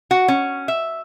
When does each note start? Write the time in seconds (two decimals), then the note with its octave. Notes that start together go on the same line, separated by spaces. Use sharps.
0.11 F#4
0.28 C#4
0.68 E5